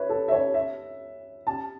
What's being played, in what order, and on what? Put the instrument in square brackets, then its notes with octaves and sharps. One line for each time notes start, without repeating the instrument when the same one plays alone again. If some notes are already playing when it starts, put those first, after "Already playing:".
Already playing: [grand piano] B4 C#5 E5
A4
E5
C#5
E5
A5